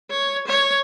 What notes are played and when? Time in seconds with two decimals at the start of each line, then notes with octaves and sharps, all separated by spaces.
0.10 C#5
0.47 C#5